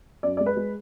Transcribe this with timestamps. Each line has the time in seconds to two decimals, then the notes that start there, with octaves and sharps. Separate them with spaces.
0.23 F#2 D5
0.37 G#3 D5
0.46 B4
0.57 G#3